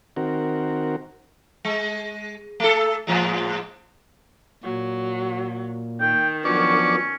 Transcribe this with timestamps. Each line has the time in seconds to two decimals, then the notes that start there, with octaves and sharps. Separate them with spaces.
0.16 D#3 C4 F#4 A#4
1.65 G#3
2.60 A3 A4
3.07 A2 F3 G#3
4.64 A#2 F#3
6.01 D#3 G5
6.45 F3 F#3 B3 C#4 D4 C#6